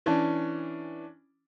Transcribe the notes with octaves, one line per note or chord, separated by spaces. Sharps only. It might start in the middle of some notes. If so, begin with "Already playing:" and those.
E3 C#4 D4